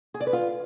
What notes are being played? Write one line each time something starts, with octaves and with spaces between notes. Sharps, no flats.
G#4
D5
B4
F4